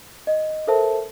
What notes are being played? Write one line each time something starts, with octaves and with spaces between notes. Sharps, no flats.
D#5
A4 A#4 C5 E5 A5